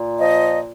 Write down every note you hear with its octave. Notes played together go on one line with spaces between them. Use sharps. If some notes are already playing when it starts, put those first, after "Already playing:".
Already playing: A#2
F3 D#5